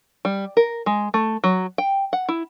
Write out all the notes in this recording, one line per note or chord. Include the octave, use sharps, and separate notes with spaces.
G3
A#4
G#3
A3
F#3
G5
F#5
E4